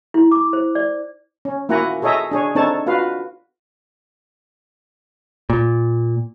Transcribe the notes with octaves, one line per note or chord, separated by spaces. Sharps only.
E4
D6
C5
D5
C#4
A#3 E4 F#4 F#5 G#5 A#5
G#4 A4 C#5 D#5 E5 A#5
D4 G#4 C#5
C4 D4 D#4 A4 C#5 A5
F4 F#4 B4 F5
A#2